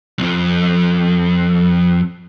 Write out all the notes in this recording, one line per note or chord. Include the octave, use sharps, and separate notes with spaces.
B1 F2